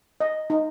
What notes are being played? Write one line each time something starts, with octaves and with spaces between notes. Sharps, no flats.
D#5
D#4